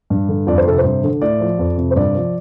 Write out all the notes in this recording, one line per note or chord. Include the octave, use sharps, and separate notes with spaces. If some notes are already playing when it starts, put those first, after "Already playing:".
G2
D3
F2 D5
C5
C3 A4
C5
G2
D3
A2 D5
F3
F2
C3
C5
G2 D5
F3